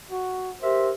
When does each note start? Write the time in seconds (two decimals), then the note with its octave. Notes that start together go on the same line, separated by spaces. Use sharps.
0.11 F#4
0.62 G4 A#4 C5 E5